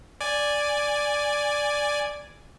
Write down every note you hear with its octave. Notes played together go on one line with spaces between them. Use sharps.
D5 G#5